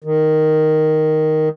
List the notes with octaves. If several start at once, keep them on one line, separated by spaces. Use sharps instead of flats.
D#3